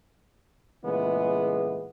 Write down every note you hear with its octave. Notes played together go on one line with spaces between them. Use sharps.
A#2 C#3 E3 G#3 A3 B3